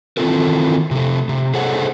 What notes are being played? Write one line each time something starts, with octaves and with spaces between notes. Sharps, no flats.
D#3 E3 C4 F4 A4 A#4
C3 A3
C3
G#4 A4 C5 C#5 D#5 F#5